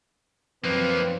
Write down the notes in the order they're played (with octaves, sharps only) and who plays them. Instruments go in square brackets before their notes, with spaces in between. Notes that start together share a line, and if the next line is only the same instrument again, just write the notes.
[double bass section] F#2 C4 [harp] F3 [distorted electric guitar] A#3 D#4 [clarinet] B4